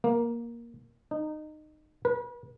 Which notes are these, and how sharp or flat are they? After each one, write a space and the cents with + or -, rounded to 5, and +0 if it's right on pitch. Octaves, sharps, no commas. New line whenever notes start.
A#3 +10
D#4 -20
B4 -35